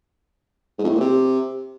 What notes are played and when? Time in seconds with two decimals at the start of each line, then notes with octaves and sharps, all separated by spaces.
0.79 G#2
0.84 F2
0.89 A2
0.95 A#2
1.00 C3